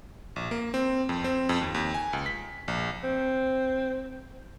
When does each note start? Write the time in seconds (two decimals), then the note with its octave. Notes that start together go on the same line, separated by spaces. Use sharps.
0.36 A#1
0.51 A#3
0.74 C4
1.09 F2
1.24 C4
1.49 F2
1.61 D#2
1.74 D#2
1.94 G#5
2.13 C#2
2.26 B6
2.68 A#1
3.04 C4